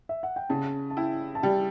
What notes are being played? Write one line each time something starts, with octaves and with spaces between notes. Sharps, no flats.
E5
F#5
G5
C#3 A5
A5
E4 G5
A5
G3 G5